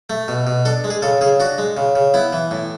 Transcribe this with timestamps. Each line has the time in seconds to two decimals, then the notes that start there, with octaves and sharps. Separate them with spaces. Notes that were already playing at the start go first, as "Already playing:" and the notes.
0.10 A3
0.28 B2
0.47 B2
0.65 D4 A4
0.84 G#3
0.90 G#4
1.02 C#3 A4
1.21 C#3 G#4
1.40 D4 F#4
1.58 G#3
1.77 C#3
1.96 C#3
2.14 B3 E4
2.33 E3
2.51 A2